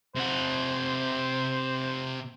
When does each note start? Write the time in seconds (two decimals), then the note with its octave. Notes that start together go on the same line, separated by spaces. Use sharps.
0.15 C3 C5 F#5